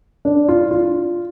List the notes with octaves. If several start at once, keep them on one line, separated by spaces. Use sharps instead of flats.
D4
F4
F4